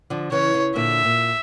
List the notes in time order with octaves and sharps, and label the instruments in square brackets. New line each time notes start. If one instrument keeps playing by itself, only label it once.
[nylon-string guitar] D3 F3
[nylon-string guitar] C#3 E3 [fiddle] C#5
[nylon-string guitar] C#3
[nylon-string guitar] A#2 D3 [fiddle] E5
[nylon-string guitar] A#2